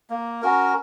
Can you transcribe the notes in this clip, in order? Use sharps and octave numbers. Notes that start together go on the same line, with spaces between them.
A#3
C#4 F#4 A#4